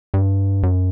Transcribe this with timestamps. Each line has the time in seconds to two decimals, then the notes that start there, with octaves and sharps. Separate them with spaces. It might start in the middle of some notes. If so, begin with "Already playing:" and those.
0.14 G2
0.63 F#2